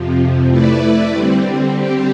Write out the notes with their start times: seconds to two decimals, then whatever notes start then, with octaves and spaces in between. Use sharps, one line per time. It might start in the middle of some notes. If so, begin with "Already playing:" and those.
Already playing: F2 C3 F3
0.49 A3 E4 B4 D5
1.09 D3 G3 C4
1.71 D3 G3 C4 G4